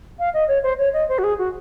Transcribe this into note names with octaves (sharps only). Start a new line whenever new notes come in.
F5
D#5
C#5
C5
C#5
D#5
C5
F#4
G#4
F#4